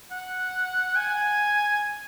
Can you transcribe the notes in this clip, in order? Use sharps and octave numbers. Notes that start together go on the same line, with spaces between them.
F#5
G#5